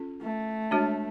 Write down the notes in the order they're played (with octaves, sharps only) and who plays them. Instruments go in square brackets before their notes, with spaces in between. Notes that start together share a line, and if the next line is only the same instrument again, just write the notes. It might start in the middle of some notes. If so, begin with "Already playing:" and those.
Already playing: [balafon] C#4 F4 A4
[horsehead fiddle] A3
[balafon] G#3 D4 F#4 C#5